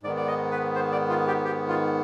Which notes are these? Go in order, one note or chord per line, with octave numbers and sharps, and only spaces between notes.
G#2 D#3 B3 D5
D5
D#5
B4
C5
D5
F4
G4
G4
F4